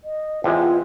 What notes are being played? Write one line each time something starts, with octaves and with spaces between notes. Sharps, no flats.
D#5
E2 C3 G#3 F4